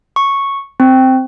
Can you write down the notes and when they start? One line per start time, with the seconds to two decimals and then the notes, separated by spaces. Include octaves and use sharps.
0.16 C#6
0.80 C4